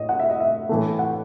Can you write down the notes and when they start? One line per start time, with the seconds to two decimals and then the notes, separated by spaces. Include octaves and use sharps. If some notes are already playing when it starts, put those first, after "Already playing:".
Already playing: A2 D#5
0.09 F#5
0.20 E5
0.30 D#5
0.40 E5
0.69 A2 E3 A3
0.99 F#5